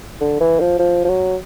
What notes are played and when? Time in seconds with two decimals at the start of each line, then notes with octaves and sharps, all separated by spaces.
0.21 D3
0.40 E3
0.60 F3
0.79 F3
1.05 F3
1.09 F#3